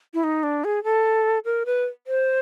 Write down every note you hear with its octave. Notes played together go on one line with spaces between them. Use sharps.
E4
D#4
D4
G#4
A4
A#4
B4
C5